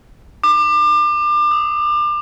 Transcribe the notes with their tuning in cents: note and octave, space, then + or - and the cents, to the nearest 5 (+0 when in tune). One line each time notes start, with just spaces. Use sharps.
D6 +30
D#6 +15